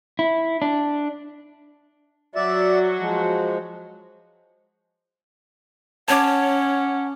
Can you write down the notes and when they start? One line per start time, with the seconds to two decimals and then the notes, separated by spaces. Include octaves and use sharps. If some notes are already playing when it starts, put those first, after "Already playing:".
0.19 E4
0.62 D4
2.35 F#3 F#4 D5 E5
2.99 F3 G#3
6.08 C#4 C#5 F#5 A5 D6